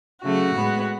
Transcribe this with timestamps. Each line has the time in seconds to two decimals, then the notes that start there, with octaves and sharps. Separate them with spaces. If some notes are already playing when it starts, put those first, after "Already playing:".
0.22 C#3 F#3 A3 F#4
0.54 A2 G#3 B3